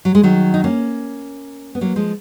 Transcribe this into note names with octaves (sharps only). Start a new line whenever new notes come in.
F#3
G#3
D#3 F#3
D#4
A#3 C#4
B3
F#3 A#3
F3 G#3